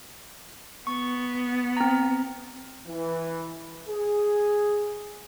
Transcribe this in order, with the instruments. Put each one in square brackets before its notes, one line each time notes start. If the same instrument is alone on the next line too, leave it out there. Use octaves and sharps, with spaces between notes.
[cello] B3 [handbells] C#6
[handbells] C4 A#5
[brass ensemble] E3
G#4